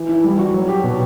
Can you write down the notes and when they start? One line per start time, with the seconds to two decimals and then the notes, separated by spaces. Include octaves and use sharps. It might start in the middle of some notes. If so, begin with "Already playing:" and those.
Already playing: E3
0.09 E4
0.24 G3
0.39 F#4
0.54 F#3
0.69 G4
0.84 B2